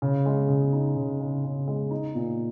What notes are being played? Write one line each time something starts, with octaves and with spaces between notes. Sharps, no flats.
C#3
G#3
C#3
D#4
C#3
C#3
C#3
G#3
D#4
A#2